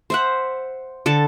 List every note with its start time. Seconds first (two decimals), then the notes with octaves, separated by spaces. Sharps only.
0.10 C5 E5 F#5
1.06 D3 A4 A5